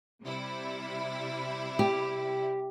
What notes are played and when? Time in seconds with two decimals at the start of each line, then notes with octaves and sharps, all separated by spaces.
0.23 C3 G3 E4
1.79 G4